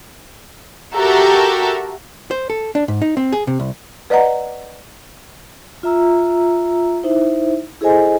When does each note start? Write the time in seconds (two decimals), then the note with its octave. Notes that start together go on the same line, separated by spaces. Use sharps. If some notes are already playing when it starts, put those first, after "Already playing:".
0.94 F#4 G4 A4 A#4 E5
2.31 C5
2.50 A4
2.75 D4
2.88 G#2
3.02 D#4
3.17 C4
3.33 G#4
3.47 C3
3.60 C2
4.10 B4 D5 D#5 F#5 A#5
5.83 F4 E5 A#5 E6
7.03 D#4 E4 C5 E5
7.81 E4 G#4 A4 C5 D#5 G#5